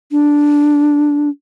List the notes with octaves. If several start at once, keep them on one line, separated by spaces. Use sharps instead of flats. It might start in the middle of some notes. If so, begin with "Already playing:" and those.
D4